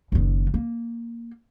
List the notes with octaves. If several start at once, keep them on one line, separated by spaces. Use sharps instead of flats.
F#1 D#3
A#3